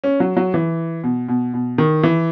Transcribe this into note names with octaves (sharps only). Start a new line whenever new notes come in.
C#4
F#3
F#3
E3
B2
B2
B2
D#3
E3